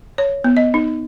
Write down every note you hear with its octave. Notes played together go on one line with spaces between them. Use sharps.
C#5
B3
D#5
D#4